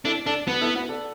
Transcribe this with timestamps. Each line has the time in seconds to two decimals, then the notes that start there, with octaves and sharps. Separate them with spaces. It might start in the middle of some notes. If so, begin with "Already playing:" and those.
0.05 D4 E4 A4
0.26 D4 A4 D5
0.47 B3 F#4 B4
0.61 E4 A4
0.75 F#4 B4
0.89 A4 D5